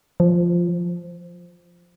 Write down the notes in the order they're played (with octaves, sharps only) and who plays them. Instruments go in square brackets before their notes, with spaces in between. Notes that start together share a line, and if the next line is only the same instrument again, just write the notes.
[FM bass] F3